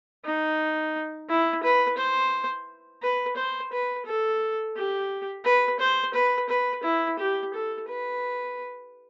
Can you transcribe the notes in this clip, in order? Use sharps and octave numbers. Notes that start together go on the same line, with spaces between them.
D#4
E4
B4
C5
B4
C5
B4
A4
G4
B4
C5
B4
B4
E4
G4
A4
B4